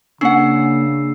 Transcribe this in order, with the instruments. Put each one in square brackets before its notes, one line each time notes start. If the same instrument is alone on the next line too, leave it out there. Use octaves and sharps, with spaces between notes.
[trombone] C#3 [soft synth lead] A#3 [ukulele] C#4 F#5 [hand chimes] D4 E6 C7